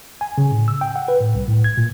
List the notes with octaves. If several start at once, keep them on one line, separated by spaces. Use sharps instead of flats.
G#5
C#3
A2
E6
G5
F#5
B4
A2
C2
A2
G#6
A#2